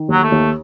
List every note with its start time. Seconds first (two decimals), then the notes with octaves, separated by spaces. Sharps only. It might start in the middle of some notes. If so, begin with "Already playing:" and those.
Already playing: D#3
0.08 D#2 F#3
0.23 A3
0.32 D#2